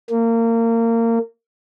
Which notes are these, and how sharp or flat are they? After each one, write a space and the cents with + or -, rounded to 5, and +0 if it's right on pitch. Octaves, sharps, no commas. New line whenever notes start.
A#3 -25